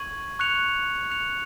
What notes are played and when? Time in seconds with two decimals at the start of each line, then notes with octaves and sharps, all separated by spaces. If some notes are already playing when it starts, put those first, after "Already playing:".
Already playing: C#6 G#6 D#7 F#7
0.39 C#6 F#6 C#7 F7
1.10 F#6 C#7 F7